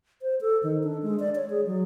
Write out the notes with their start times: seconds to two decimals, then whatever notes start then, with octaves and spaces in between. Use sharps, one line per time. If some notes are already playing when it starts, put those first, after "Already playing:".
0.22 C5
0.41 A4
0.63 D#3
0.83 D4
1.02 G#3
1.19 D5
1.35 C#5
1.50 G#4
1.66 F#3